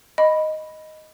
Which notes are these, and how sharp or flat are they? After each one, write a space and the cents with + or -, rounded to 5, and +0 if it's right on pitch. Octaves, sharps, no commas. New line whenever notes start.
D#5 +0 B5 +0